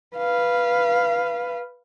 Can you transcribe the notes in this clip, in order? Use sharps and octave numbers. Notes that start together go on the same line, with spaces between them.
B4 F5